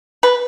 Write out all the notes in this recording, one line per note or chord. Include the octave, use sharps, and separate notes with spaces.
B4